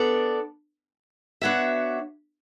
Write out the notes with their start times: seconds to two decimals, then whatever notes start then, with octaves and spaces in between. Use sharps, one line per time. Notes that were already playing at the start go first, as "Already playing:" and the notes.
Already playing: B3 D4 A4 D5
1.41 B3 D4 F#4 C#5 E5